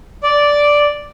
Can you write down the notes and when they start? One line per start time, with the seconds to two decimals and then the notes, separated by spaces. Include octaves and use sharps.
0.23 D5